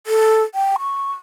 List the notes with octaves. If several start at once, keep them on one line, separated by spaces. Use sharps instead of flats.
A4
G5
C#6